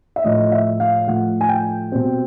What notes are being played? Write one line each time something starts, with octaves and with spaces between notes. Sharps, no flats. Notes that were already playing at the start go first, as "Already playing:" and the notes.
E5
A2 F3 A3 D#5
E5
F5
A2 F3 A3 F#5
G#5
G5
B2 G3 C4